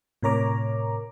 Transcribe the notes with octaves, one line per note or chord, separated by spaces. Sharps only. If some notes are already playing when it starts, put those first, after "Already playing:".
A2 C3 A#4 C#5 A#5 D6